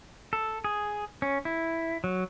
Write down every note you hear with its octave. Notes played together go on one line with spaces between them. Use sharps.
A4
G#4
C#4
E4
F#3